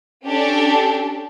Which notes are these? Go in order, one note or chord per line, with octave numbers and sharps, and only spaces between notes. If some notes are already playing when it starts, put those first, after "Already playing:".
C#4 D4 G4 A4